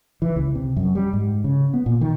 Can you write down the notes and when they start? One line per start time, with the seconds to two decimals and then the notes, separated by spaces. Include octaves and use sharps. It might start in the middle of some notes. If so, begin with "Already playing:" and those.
0.22 E3
0.36 C#2
0.55 C3
0.77 F#2
0.95 G3
1.13 G#2
1.44 C#3
1.74 B3
1.86 A#2
2.01 D#3